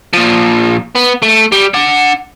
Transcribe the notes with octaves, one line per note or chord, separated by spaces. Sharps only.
A#2 F3
B3
A3
G3
D4 F#5